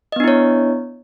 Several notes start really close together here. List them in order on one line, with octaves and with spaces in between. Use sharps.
D#5 B3 D4 E4 C#5